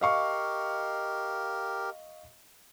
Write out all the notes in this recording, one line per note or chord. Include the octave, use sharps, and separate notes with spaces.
G4 A#4 D#5 F5 C#6